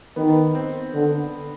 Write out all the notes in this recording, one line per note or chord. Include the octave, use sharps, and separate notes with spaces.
D#3 B3
C4
D3